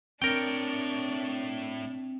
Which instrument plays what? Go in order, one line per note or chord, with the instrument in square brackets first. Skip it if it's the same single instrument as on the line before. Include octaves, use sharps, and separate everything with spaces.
[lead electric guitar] A2 C#5 [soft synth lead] C4 [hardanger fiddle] D4 [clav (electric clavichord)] A#4 G5